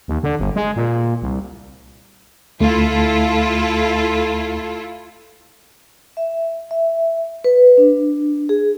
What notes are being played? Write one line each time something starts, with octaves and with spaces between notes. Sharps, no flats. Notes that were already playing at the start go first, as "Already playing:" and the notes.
D#2
D3
G1
G#3
A#2
C2
D2 A3 E4 F4 A4
E5
E5
B4
D4
G#4